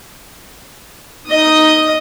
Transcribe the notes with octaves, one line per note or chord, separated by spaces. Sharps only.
D#4 D#5 D#6